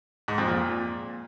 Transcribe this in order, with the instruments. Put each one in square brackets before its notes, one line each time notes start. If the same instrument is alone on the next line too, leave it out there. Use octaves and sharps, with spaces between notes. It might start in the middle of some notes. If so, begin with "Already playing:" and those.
[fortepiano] G#2
F2
A#2